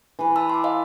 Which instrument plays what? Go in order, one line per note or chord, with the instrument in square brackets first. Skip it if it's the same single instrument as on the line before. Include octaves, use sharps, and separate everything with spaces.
[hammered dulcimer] E3 B4
[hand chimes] A5 B5 E6
C6 D6
D#5 F5